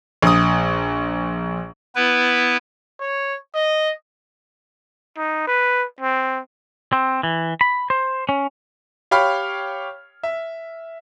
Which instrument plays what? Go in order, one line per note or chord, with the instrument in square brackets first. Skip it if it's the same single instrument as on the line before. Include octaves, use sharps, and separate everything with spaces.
[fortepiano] A#1 D#6
[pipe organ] B3 E4 B4
[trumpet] C#5
D#5
[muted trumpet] D#4
B4
C4
[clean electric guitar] C4
E3
B5
C5
C#4
[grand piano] G4 C#5 F5 G5 B5 F6
E5